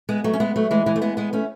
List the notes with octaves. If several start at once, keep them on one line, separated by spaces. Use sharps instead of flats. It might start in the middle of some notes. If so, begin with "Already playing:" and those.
G#3 B3
F#3 A3
C#4
G#3 B3
F#3 A3
E3 G#3
E3 G#3
A3
G#3 B3
G#3 B3
A3 C#4